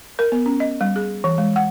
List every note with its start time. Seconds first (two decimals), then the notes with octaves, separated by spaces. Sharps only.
0.19 A#4
0.32 B3
0.46 C#4
0.60 D#5
0.81 G3
0.96 G#4
1.24 E3
1.38 G#3
1.56 F#5